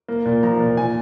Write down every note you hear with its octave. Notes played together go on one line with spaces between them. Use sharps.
A#3
A#2
F3 A#5
A#2
A#2 G#5